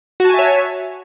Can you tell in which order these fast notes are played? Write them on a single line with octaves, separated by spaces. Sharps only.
F#4 A5 G#5 E5 C#5